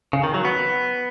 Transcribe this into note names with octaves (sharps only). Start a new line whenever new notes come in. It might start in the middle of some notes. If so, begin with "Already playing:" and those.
C#3
D#3
F#3
B3